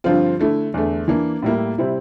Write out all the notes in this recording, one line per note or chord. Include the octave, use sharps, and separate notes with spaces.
G2 D3 F3 C4 F4
D3 A3 E4
E2 D3 A3
E3 A#3 D4
A2 G3 A#3 E4
C3 G3 C4 E4